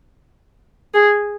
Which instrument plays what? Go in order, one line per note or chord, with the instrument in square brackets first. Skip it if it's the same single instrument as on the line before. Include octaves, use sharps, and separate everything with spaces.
[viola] G#4